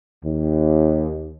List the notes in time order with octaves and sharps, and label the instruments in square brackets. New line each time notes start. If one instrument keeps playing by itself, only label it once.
[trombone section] D#2